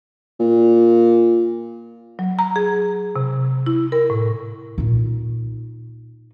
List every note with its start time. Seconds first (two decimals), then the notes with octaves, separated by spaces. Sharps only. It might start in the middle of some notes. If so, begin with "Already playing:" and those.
0.40 A#2
2.19 F#3
2.39 A#5
2.56 G#4
3.16 C3
3.66 E4
3.92 A#4
4.10 A2
4.78 A#2 D#4